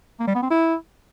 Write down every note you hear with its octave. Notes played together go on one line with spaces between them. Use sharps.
A#3
G3
B3
C4
E4